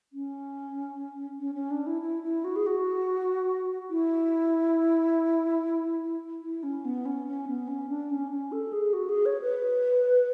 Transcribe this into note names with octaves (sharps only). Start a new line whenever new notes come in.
C#4
C#4
C#4
D4
E4
E4
E4
F#4
G#4
F#4
E4
E4
C#4
B3
C#4
C#4
B3
C#4
D4
C#4
C#4
A4
G#4
F#4
G#4
C#5
B4